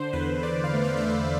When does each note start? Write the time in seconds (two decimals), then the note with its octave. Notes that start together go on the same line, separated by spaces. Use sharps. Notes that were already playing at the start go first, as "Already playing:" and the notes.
Already playing: D3 C5
0.13 E2 B4
0.43 D3 D5
0.64 F5
0.73 A3
0.84 F5
0.97 E5
1.04 D3
1.10 F5